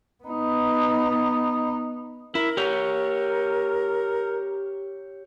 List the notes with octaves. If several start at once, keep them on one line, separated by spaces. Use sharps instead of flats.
B3 D#4
E4 A#4
G4 C#5